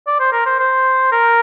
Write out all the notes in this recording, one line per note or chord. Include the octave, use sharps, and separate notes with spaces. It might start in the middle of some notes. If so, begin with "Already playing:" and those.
D5
C5
A#4
C5
C5
A#4